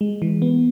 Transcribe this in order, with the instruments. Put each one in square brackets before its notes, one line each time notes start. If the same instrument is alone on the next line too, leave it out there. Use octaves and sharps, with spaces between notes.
[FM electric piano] G#3
E3
B3